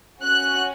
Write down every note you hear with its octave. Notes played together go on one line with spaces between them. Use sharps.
C#4 F#4 F#6